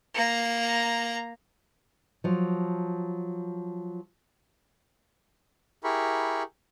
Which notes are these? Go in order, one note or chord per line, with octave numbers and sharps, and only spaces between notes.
A#3 A#5
F3 F#3
E4 G4 G#4 A#4 B5 C#6